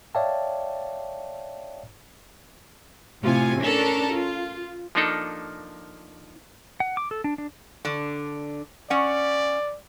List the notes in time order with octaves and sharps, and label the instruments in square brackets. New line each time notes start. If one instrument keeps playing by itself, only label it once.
[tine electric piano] C#5 D5 E5 F5 G5 A5
[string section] A2 C3 F4 G#5
C#4 D4 A4 A#4
F4
[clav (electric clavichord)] F3 A#3 D4 D#4 A4
[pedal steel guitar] F#5
D6
A4
D4
D4
[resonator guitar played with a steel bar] D3 D4
[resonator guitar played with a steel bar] C#4 F#5 [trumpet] D5